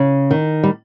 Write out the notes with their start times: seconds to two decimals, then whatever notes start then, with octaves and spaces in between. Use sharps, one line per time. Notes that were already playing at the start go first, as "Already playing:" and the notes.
Already playing: C#3
0.31 D#3
0.63 G3